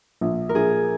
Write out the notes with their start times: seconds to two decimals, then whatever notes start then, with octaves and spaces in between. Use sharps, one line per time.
0.21 A#1
0.49 A#4
0.55 A#1 G#4